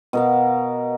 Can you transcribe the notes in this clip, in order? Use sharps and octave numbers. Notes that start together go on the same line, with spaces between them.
B2 A#4 F5